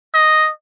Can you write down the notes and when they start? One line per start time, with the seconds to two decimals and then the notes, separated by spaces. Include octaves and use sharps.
0.14 D#5